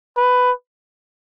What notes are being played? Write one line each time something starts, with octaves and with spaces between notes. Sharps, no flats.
B4